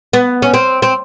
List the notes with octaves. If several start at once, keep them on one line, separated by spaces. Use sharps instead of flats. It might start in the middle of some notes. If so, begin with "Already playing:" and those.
B3
C#4
C4
C4